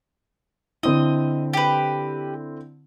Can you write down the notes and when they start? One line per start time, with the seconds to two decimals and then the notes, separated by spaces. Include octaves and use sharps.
0.83 D3 C4 E4 D#5
1.53 G4 B4